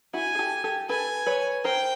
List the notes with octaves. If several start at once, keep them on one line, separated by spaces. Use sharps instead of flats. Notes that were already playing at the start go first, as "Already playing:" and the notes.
E4 F#4 G#5
G#4
G4 A4
G4 A4
A4 B4 G#5
B4 C#5
A#4 C5 G5